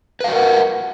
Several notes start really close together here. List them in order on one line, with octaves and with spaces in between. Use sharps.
B4 F5 F#4 A#4 F#5